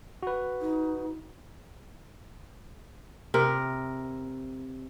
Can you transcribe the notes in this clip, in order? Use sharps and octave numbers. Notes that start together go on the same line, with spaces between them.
F#4 B4
D#4
C3 A#4